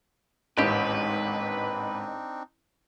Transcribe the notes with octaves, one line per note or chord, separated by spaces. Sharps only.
A1 D#2 G#2 C4 D4 D#4 G4 B4